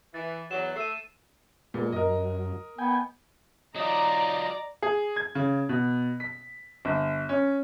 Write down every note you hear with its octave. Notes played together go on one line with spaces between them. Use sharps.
E3 A6
E2 F#3 E7
A3 E5 C7 D#7
A#2 G#3 A#3 B3
F#2 A#4 D#5
B3 G5 G#5
F#3 D#4 F4 D5 D#5 A#5
G#4
G#6
C#3
B2
B6
G1
C#4